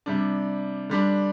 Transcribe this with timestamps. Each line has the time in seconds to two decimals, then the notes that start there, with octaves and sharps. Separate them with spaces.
0.06 C3 G3 D4
0.89 D3 G3 D4